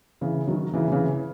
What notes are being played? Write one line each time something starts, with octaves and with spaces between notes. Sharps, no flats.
C#3 E3
D#3 F#3
C#3 E3
C#3 E3